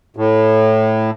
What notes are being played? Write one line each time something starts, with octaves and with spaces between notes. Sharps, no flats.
A2